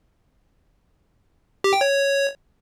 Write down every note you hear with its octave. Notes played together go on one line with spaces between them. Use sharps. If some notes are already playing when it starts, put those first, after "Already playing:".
G4
G5
C#5